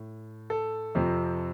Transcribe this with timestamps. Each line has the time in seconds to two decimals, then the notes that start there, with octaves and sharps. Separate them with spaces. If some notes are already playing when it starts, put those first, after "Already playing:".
Already playing: A2
0.50 A4
0.95 F2 C3 F3 C4